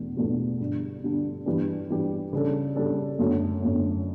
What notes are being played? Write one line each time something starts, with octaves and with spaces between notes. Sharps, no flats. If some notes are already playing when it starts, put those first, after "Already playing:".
Already playing: E2 B2 A3 D4
E2 B2 A3 D4
G1 G2 D3 G3
G1 G2 D3 G3
G2 E3 G3 D4 G4
G2 E3 G3 D4 G4
C#3 G3 D4 A4
C#3 G3 D4 A4
F#2 D3 F#3 A3 C#4
F#2 D3 F#3 A3 C#4